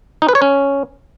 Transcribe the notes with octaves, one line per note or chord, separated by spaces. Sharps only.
D#4
B4
C#5
C#4